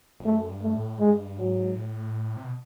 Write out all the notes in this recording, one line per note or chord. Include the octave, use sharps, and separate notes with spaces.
F2
F#2 A3
G2
A3
A2
G2 G#3
G#2 F#3
A2
C3
B2